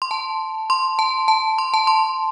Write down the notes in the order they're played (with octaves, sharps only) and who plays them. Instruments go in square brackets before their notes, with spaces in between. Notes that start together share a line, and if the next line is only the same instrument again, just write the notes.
[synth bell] C6
A5
C6
A5
A5
C6
A5
C6